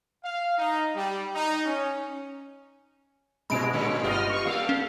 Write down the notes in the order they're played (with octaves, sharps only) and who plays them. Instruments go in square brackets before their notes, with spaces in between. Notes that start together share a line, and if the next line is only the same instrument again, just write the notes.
[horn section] F5
D#4
G3
D#4
C#4
[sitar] G#2 G3 [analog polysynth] B2 G#3 [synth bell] B5 D7
[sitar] A2 D3 C#4
[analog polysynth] G1 D#5 F6 [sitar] B3 F4 G4
[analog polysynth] C#6
[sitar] G3 A#3 A4 [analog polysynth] F5
[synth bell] C#4